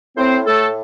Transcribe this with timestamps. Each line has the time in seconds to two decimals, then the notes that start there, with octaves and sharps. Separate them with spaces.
0.17 A2 C4 C5
0.46 A2 A3 A4